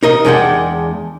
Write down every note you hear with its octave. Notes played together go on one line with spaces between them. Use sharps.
D#4 A#4 D#5
E2 G#3 D4 C#5 F#5 G5